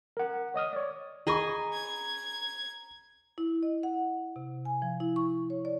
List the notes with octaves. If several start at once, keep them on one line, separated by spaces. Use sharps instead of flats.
A#4 F#5
C#5 D#5 D#6 F6
C#5 D5
G#4 D#5 G#5 A#5 B5 C#6
G#6
E4
D#5
F#5
C3
G#5
F3
E4
C#6
C#5
D5